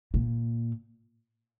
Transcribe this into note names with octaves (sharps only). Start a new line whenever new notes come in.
A#2